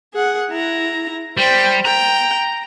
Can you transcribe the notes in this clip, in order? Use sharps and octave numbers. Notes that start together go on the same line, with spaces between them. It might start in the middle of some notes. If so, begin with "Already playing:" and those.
G#4 F#5
E4 A#5
G3 C5 G5
G5 A#5